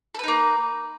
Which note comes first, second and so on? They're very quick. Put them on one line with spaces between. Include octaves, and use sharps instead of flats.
A4 B4 D#4 A#3